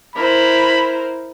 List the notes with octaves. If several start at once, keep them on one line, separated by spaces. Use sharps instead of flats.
E4 A#4 C5 B5